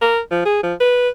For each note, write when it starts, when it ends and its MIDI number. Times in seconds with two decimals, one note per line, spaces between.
0.01 0.20 70
0.31 0.41 53
0.45 0.58 68
0.63 0.74 53
0.80 1.09 71